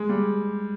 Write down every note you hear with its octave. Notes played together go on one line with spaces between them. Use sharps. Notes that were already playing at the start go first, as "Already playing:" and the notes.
Already playing: G#3
G3